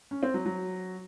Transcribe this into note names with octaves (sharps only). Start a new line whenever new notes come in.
C#4
C4
F#3
F#3